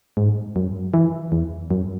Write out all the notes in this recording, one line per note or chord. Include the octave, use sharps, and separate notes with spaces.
G#2
F#2
E3
E2
F#2